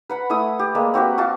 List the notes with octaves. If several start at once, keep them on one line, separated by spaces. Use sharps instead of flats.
B4 F#5 B5
A3 E4 A5 D#6
G4
G#3 A#3 D5
C4 F#4 G4 B4
F4 F#4 A5